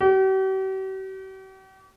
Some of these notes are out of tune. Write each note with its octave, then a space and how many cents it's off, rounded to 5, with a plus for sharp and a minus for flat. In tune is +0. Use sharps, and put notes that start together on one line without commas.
G4 -45